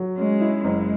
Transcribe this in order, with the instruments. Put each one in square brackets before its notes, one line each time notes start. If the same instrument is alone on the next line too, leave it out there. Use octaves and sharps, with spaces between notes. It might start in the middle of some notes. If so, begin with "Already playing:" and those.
Already playing: [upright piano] F#3
[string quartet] G#3 [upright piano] C#4
[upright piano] E4
[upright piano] F#1 [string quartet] G#3